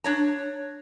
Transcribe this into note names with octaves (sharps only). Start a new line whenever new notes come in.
D4 C#5 A#5